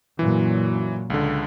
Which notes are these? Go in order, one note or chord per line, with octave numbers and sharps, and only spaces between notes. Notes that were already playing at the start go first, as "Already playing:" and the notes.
F#2 A#2 E3 F#3
C#2 D3